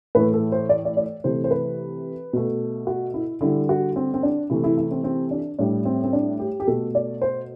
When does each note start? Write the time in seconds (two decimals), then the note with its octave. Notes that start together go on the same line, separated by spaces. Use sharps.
0.15 A2 E3 A3 B4
0.34 A4
0.52 C5
0.69 D5
0.85 D5
0.97 D5
1.24 C3 E3 A3 C5
1.44 C5
1.51 B4
2.33 B2 A3
2.87 F#4
3.14 E4
3.41 D3 G3 E4
3.69 F#4
3.96 C4
4.14 C4
4.23 D4
4.50 C3 E3 A3 E4
4.64 E4
4.78 E4
4.91 C4
5.04 C4
5.31 D4
5.59 A2 G3 D4
5.85 C4
6.04 C4
6.13 D4
6.39 G4
6.60 G4
6.67 B2 A3 A4
6.95 D5
7.22 C5